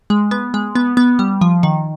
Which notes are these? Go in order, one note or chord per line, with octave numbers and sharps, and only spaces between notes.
G#3
B3
G#3
B3
B3
G3
F3
D#3